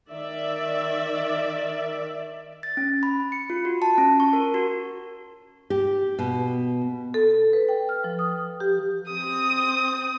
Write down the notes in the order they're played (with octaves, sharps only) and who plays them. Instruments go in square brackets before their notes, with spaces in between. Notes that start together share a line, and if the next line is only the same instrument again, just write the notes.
[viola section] D#3 D5 E5
[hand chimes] A6
C#4
B5
C#7
F4
F#4
A5
C#4
C#6
A#4
F#4
[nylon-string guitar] G4
B2
[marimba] A4
B4
G5
F6
F3
D#6
G4
[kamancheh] C4 D#6